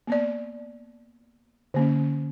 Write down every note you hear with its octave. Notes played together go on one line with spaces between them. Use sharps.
A#3 B3 D5
D3 A#3 C#4